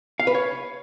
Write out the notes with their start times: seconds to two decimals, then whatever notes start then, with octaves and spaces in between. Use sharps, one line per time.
0.20 F5
0.27 B4
0.35 C#5